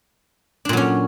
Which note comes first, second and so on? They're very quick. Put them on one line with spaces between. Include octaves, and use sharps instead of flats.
D4 A#2 F#3 C#4